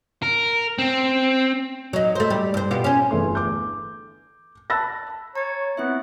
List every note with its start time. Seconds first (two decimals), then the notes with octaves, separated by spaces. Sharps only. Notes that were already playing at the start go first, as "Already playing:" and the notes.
0.22 A#4
0.78 C4
1.93 F#3 D#4
2.15 A3 C5
2.30 G3
2.54 G2 C5
2.71 B2 F4 G4
2.84 C#4 C5
3.11 G1 E2 A3 C6
3.35 D6 G6
4.70 A5 B5 E6 F#6 A6 A#6
5.35 C#5 A#5 A6
5.77 B3 C4 E4 E5